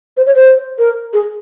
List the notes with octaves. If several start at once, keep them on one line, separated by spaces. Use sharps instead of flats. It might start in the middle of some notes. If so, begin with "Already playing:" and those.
C5
C#5
C5
A#4
G#4